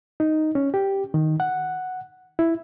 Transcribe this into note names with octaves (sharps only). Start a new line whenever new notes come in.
D#4
C#4
G4
D#3
F#5
E4